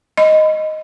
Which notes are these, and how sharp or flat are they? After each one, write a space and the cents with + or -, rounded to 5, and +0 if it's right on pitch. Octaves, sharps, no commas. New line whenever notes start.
D#5 +0 B5 +40